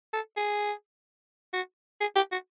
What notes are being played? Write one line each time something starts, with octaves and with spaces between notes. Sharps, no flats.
A4
G#4
F#4
G#4
G4
F#4